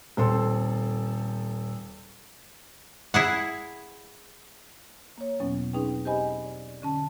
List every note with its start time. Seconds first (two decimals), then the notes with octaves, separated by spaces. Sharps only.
0.17 D#1 C4 A4 C6
3.14 E4 G#4 F#5
5.18 A#3 C#5
5.40 E2 B2 F#3 B3 C#4
5.73 C4 C#4 D#4 G#4 B4 G5
6.05 G4 C5 D#5 G#5 B5
6.45 D5
6.82 D3 C#4 A5